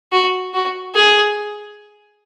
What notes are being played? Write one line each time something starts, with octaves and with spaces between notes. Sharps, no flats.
F#4
F#4
G#4